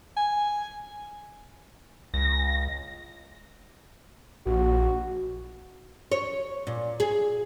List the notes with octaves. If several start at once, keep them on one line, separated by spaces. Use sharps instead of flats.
G#5
C#2 A#6
A#1 F#4
C#5
A#2
G#4